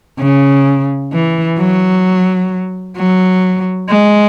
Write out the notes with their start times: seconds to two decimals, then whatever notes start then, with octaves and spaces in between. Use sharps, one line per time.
0.19 C#3
1.12 E3
1.57 F#3
2.97 F#3
3.89 G#3